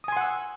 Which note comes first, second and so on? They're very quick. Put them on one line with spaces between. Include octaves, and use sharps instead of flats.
D#6 G#5 C6 F#5 E6